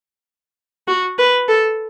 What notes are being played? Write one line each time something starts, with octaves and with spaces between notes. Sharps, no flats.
F#4
B4
A4